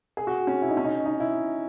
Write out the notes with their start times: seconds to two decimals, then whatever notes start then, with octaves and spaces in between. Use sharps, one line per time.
0.17 G#4
0.27 F#4
0.47 C#4
0.62 E4
0.69 D#4
0.77 C#4
0.84 D#4
1.06 D#4
1.20 E4